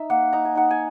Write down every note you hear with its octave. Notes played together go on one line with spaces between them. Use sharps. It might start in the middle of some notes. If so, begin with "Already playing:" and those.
Already playing: D#4 E5
A#3 F#5
D#4 A#5
G#5
D#4 F#5
G#5